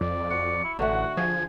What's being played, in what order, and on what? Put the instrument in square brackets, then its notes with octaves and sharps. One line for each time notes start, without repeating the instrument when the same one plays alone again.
[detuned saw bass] F2 [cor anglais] D5
[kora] F#4 [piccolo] C#7
[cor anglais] E4
[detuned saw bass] A1 [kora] D3 A3 [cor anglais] F#4 [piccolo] F#5
[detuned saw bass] F3 [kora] G#4 [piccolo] G#6